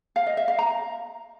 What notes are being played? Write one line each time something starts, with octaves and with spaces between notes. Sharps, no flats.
F5
D#5
E5
F5
A#5